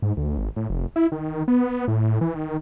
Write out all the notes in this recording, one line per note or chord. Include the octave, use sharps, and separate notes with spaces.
G#2
D2
G#1
A2
F1
E4
D#3
B3
A2
E3
D#3